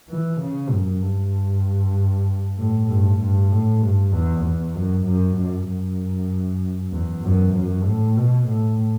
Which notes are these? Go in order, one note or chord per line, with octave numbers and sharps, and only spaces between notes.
E3
C#3
F#2
G2
A2
G2
G2
A2
G2
E2
E2
F#2
F#2
F#2
F#2
E2
F#2
F#2
A2
B2
A2